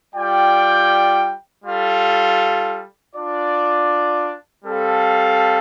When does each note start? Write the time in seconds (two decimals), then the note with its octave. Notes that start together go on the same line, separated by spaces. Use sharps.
0.14 G3 F4 D5 G5
1.63 G3 F4 A4
3.14 D4 F4 D5
4.63 G3 C4 A4 F5